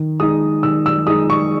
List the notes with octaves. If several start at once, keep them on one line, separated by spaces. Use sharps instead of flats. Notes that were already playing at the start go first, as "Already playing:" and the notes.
Already playing: D#3
G#3 D#4 D#6
D#3 E6
E6
G#3 D#4 D#6
C#6